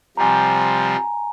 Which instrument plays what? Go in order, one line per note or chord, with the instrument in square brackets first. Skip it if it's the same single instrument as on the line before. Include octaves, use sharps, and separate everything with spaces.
[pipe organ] C3 F3 G3 [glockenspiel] G#5 A#5